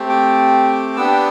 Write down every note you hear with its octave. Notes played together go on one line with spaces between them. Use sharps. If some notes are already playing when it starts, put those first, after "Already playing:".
Already playing: A3 C4 G4
D6
B3 D4 G4 E6